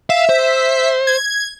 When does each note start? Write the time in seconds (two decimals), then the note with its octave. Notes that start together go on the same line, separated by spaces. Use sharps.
0.10 E5 F5
0.29 C5
1.07 G#6